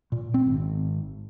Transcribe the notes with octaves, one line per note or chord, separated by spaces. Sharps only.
A#2
C4
G#1